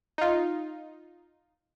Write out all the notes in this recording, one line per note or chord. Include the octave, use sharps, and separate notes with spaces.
D#4 F4